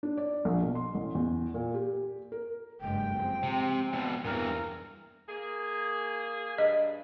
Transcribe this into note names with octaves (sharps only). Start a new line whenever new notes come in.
D4
D5
A#1
B2
C6
A1
E2
A#2
G4
A#4
F#1 G2 G#3 G5
F3 G#3 C4
C3
E2 B2
E2 G2 E3 A#4
A#3 G#4
G2 D#5